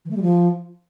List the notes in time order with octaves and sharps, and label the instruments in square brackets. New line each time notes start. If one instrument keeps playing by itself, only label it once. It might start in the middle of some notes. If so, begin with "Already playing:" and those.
[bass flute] E3
A3
G3
F3